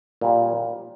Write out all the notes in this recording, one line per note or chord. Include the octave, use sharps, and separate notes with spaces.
A#2 G3